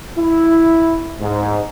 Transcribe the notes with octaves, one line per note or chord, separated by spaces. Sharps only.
E4
G#2